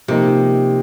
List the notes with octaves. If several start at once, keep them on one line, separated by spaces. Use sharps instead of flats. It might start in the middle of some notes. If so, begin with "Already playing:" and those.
C3 F3 A#3 D#4 A#4